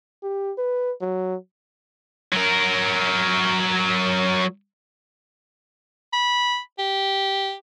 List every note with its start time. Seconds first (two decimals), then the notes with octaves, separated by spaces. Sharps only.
0.23 G4
0.58 B4
1.01 F#3
2.33 F#3 A#4
6.13 B5
6.79 G4